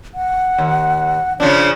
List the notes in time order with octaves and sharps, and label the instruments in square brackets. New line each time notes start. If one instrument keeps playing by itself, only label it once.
[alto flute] F#5
[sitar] D#2
[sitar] C#3 F3 D4 [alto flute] C#5